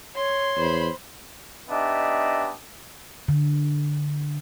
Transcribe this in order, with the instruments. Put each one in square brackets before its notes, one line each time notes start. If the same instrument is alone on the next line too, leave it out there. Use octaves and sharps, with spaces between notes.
[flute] C#5 [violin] C6
[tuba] E2 [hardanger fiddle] C5 B5
[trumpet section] B3 D4 D#4 G4 D#5 E5
[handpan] D3